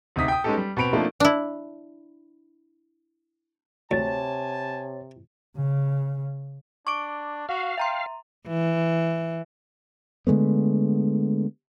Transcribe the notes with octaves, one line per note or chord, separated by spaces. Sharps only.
D2 C3 D#4 D#6 B6
G5 D#6
G#3 B3 C#4 D#4 G4 A4
G3
B2 C4 B5 D7 F7
F3 A3 A#3 C4 D4 D#4
D4 E4
D2 C3 C#5 G#5 A5 A6
C#3
D4 C#6 D6 D7
F#4 F5
E5 G5 A#5 C6
E3
D3 G#3 A3 B3